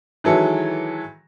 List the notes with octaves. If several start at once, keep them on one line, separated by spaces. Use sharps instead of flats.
D#3 E3 F#3 G#3 E4 A4